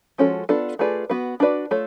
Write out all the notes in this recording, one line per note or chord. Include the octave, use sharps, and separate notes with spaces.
F3 G#3 C#4 F#4 A4
B3 D4 F4 A4
A3 F4 G#4 B4 D5
B3 F#4 B4
D4 F#4 B4 D5
A3 F4 A4 C#5